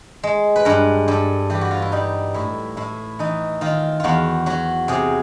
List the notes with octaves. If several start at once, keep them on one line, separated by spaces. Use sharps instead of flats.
G#3
B4
G2 A#4
G2 A4
E3 G4
F#4
F4
E4
G3 D#4
A2 E4
A2 E4
E3 D#4
D#3 F4
E2 F4 F#4
F#3 F#4
C3 G#4